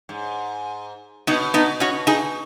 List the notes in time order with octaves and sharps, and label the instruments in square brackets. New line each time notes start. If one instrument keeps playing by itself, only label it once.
[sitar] G#2
[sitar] B2 [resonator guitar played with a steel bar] B3 D#4
[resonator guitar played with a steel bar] B3 D#4
C#4 F#4
D#4 G#4